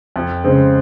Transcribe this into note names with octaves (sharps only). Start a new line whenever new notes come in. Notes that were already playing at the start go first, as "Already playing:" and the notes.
F2
C#3 G#3 C4